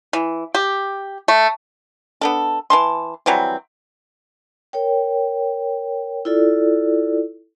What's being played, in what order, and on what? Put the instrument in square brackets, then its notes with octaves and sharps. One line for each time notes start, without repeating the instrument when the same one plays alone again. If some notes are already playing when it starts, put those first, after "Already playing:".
[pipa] E3
G4
A3
B3 D4 A4
E3 A5 C6
E3 F#3 G3 C4
[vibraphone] A#4 C#5 G5
E4 F4 A4 D5